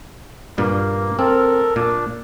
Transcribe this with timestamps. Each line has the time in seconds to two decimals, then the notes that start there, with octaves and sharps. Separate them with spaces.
0.58 G2 A#2 A#3
1.19 C4 A4 A#4
1.76 A#2 D4